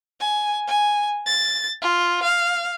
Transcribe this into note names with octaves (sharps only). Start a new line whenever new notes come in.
G#5
G#5
A6
F4
F5